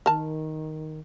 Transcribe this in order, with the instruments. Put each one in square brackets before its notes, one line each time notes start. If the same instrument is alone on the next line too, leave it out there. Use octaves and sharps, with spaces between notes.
[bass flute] D#3 [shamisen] A#4 A5